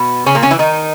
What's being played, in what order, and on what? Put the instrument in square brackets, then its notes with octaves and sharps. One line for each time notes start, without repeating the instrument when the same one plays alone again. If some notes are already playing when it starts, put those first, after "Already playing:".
Already playing: [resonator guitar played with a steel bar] B2 B3
C#3 C#4
A#2 A#3
C#3 C#4
E3 E4
D#3 D#4